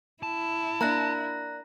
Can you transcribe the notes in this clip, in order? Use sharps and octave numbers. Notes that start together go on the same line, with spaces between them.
E4 A5
A#3 D4 A#5 F#6 A#6